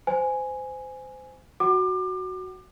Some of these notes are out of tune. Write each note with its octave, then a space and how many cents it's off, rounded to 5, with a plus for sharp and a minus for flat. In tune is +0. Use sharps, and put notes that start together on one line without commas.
C5 -25 G#5 +0
F#4 +0 F#5 +45 D6 +30